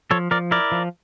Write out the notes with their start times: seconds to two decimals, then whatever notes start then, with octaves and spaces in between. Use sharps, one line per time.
0.11 F3 A4 C#5
0.31 F3 A#4 D5
0.51 E4 A#4 D5
0.72 F3